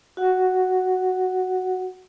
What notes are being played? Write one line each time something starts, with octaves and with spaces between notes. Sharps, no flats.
F#4 F#5